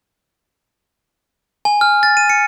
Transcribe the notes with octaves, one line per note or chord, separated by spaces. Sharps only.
G#5
F6
A6
D#7
C#7